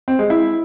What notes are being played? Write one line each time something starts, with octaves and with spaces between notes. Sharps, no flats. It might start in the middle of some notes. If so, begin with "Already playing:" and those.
C4
G#3
E4